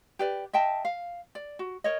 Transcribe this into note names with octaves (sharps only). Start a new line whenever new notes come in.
G4 B4 D5
D#5 E5 G5 A5
F5
D5
F#4
A#4 C#5 D#5